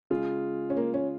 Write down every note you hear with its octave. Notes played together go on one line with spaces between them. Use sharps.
C#3 G#3 F4 G#4
C#4
A#3
C#4